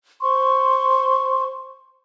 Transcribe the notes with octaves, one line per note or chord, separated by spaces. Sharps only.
C5 C6 C#6